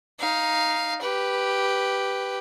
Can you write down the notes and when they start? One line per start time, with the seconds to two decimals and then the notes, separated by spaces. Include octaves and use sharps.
0.19 D#4 F5
1.02 G4 B4